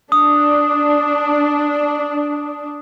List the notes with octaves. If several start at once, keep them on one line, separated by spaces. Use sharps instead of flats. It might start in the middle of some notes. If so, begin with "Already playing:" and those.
D4 D#6